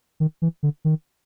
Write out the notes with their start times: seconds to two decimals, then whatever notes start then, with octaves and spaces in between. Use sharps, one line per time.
0.20 D#3
0.42 E3
0.63 D3
0.85 D#3